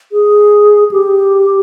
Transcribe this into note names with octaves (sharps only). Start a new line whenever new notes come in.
G#4
G4